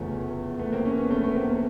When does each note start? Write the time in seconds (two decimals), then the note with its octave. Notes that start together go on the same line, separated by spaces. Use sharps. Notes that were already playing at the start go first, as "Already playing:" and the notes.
Already playing: F1 E2 C#3 F3 A3 B3
0.59 A3 B3
0.72 A#3 C4
0.85 B3 C#4
0.98 B3 C#4
1.11 A3 B3
1.24 A3 B3
1.36 A#3 C4
1.49 A#3 C4